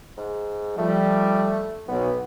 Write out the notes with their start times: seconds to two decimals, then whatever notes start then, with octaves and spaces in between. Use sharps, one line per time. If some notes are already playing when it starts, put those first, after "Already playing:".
0.17 G#2
0.78 F3 G3 A3
1.88 B1 B3